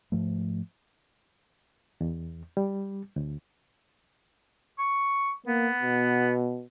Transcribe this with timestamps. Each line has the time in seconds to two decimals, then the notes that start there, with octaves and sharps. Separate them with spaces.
0.12 G#2 F3 A3
2.01 E2
2.57 G3
3.16 D2
4.79 C#6
5.46 A#3 B3
5.83 B2